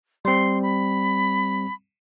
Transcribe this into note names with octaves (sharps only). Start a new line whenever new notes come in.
G3 C4 C6
B5